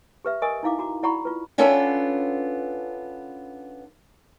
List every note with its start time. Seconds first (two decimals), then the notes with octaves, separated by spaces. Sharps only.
0.25 G4 B4 E5
0.42 A#4 D#5 G#5 C#6 D#6
0.63 D#4 E4 F5 D6
0.79 F#4 A#5 D6
1.03 E4 D5 F#5 A#5 B5 C#6
1.25 F4 B4
1.58 B3 C#4 D4 F4 A4 G5